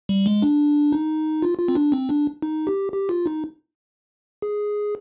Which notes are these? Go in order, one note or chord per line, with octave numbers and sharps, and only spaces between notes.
G3
G#3
D4
D#4
F4
F4
C4
D4
C4
D4
D#4
G4
G4
F4
D#4
G#4